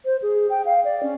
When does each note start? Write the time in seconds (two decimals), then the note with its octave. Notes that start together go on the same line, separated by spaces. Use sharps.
0.05 C5
0.22 G#4
0.50 G5
0.66 F5
0.85 D5
1.03 C#4